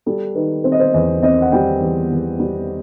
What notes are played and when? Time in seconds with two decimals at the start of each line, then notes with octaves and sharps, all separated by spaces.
0.06 G3 A4
0.35 D#3 B4
0.64 C4 C5
0.72 D#5
0.80 C5
0.94 E2 D#5
1.23 C4 D#5
1.42 F#5
1.52 G3 G5
1.81 E2
2.11 E2
2.40 G3